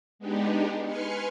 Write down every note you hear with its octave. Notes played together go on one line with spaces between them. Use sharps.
G#3 B3 D4 D#4 G4
B4 G#5 C6 F6 C#7